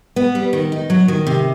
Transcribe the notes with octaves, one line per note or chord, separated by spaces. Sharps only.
B3
G3
D#3
D#4
F#3
D#3
C3